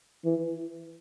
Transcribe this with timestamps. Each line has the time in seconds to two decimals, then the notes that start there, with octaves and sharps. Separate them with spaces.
0.25 E3